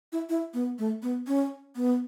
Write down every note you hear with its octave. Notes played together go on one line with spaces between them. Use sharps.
E4
E4
B3
A3
B3
C#4
B3